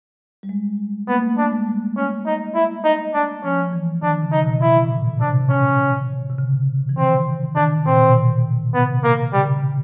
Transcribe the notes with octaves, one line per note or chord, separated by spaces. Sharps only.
G3
G#3
A#3 B3
A3
D4
G#3
G3
C#4
D#4
E4
D#4
D4
F3 C#4
E3
D#3 D4
C#3
D#4
B2
B2 E4
A2
A#2
C3 D4
C#4
C3
C#3
E3
D#3 C4
D#3 D4
A#2 C4
B2
B2
C3 B3
A#3
C#3 G3